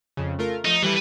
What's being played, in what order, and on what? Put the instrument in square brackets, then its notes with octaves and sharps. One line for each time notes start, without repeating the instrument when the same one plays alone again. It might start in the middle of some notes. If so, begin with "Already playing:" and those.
[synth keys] F2 C#3
A3 F4 A#4
[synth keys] F3 A3 [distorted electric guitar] D#4
[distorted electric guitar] E3 B4 [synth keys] G3 G4 A4